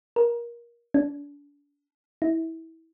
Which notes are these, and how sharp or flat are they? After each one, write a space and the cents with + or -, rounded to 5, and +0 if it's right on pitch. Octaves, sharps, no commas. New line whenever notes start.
A#4 +20
D4 -35
E4 -25